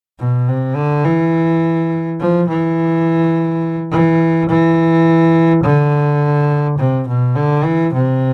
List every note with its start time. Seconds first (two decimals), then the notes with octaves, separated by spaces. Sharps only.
0.19 B2
0.48 C3
0.76 D3
1.05 E3
2.20 F3
2.48 E3
3.91 E3
4.49 E3
5.64 D3
6.78 C3
7.07 B2
7.35 D3
7.64 E3
7.93 C3